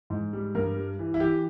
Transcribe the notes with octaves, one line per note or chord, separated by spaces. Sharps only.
G#2
G3
G2 A#4
G3
E3
E4
E3 G4